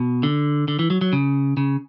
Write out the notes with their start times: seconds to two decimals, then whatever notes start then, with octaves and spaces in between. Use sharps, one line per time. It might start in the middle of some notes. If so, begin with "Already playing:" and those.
Already playing: B2
0.23 D3
0.68 D3
0.79 E3
0.90 F#3
1.01 F#3
1.13 C#3
1.57 C#3